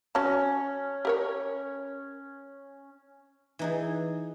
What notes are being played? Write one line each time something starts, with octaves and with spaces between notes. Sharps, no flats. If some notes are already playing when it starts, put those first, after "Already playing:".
C#4 F#4 A5
G4 A#4 C#5
E3 D#4 G#4